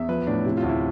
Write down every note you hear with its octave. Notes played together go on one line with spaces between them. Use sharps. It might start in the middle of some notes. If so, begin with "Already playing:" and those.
Already playing: E2 E5
F3 B4
A2 D4
C3 E4
F4
D2
E4